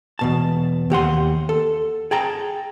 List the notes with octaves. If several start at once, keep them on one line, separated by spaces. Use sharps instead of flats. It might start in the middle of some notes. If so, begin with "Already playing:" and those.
E2 B2 A5
D#2 G4 F#5 C6
A4
G#4 G5 A5 A#5